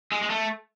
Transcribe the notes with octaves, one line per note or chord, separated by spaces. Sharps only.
G#3
G#3
A3